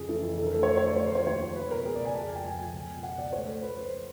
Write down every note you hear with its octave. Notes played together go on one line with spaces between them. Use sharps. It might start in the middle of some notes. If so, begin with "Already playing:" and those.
Already playing: F2 C#3 G#4
E3 A4
F2
D3 A4
A#4
A3 A4
C#5
A3 C5
C#5
A3 D5
F3 C#5
C5
F3 C#5
D#2 C#5
F3
C#2 B4
B2 A#4
C#2 G#4
D5
C#2
G#5
F2 A5
F2
G5
F3 G#5
F2 G#5
C#2
B2
B2 F#5
C#2 D5
A3 C#5
A3 C5
A3 B4
F3 C5